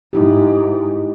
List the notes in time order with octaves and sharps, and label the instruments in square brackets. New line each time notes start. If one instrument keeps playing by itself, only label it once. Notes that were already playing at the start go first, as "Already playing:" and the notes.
[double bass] G#2 [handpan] D#4 E4 G4